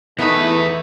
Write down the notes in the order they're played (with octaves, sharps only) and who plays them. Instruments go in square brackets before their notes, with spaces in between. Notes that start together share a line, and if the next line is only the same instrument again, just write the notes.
[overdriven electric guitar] E2 B4 [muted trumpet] A3 [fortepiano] B3 D#4 [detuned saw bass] E4